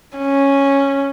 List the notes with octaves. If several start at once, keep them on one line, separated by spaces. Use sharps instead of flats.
C#4